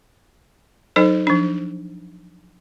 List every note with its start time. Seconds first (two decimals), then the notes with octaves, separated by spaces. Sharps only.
0.96 F#3 D#4 A4 C5
1.27 F3 D4